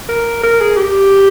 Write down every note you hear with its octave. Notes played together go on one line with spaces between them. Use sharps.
A#4
A#4
G#4
G4